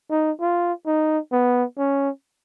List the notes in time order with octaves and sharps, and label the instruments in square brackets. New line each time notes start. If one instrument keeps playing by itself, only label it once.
[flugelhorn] D#4
F4
D#4
B3
C#4